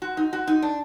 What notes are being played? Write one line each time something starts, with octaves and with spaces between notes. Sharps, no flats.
F#4
D#4
F#4
D#4
D4